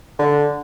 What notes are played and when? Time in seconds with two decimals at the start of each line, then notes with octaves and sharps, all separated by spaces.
0.19 D3